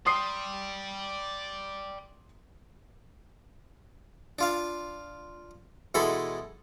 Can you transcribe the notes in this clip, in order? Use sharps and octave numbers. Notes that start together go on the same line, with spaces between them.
D5 G5 C6 D#6 C7
D4 F4 F5
B2 E3 G#3 A4 B5 C6